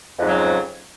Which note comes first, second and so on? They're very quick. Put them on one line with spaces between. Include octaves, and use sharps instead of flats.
F2 G#2 F#3 C#3